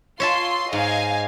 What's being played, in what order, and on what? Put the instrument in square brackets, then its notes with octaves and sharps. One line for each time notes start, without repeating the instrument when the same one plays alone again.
[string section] F4 C6 [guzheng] C#5 E5 A5
[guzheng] G#2 [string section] D#5 F5 G#5